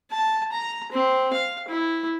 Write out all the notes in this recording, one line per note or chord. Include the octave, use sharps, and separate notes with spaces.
A5
A#5
C4
F5
E4